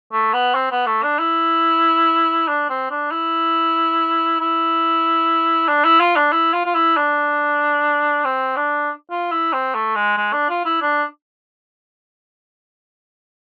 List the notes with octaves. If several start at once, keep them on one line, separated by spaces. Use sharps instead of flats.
A3
B3
C4
B3
A3
D4
E4
D4
C4
D4
E4
E4
D4
E4
F4
D4
E4
F4
F4
E4
D4
C4
D4
F4
E4
C4
A3
G#3
G#3
D4
F4
E4
D4